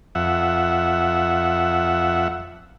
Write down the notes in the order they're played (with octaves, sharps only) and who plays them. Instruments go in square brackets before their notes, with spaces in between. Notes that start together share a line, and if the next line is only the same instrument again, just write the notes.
[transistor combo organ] F2 E5 F#5